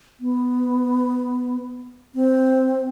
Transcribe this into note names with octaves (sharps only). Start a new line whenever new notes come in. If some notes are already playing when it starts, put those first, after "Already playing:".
B3
C4